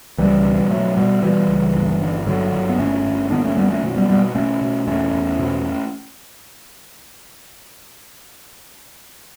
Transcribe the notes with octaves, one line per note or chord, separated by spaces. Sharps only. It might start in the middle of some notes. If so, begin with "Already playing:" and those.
C#2 E3 G3
B2
B2 F#3 A3
B2 G3 B3
B2 E3 G3
C#2
G1
D3
G1 D3 F#3
G1
B3
G1 A3 C#4
G1
D3 B3 D4
A3 C#4
F#2 G3 B3
A3 C#4
B2
G3 B3
B2 G3 B3
B2 A3 C#4
B2
E2 A3 C#4
E2
B2